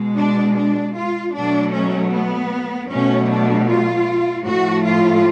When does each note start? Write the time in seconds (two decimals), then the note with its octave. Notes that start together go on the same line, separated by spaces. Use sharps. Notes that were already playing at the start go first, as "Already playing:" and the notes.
Already playing: B2 G#3
0.18 D4
0.57 D4
0.96 F4
1.35 B2 F#3 A3 D4
1.74 C#4
2.12 B3
2.90 B2 F#3 A3 C#4
3.30 D4
3.69 F4
4.46 A2 F3 A3 F#4
4.85 F4